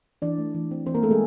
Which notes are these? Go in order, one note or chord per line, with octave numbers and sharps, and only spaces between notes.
E3 D4 D5
A3
E3
C4
E3 C4 C5
A#3 A#4
A3 A4
G#3 G#4